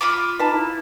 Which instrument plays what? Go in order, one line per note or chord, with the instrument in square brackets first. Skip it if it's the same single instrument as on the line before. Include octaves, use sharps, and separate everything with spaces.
[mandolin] F4 B5 D6
[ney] D#4 [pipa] B4 A5
[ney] E4